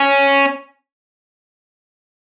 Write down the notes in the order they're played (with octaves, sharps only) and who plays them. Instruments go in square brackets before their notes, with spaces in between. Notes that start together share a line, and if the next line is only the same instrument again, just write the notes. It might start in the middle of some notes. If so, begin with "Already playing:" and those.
Already playing: [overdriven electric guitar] C#4